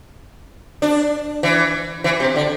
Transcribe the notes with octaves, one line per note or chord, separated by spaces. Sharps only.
D4
E3
E3
C3
D3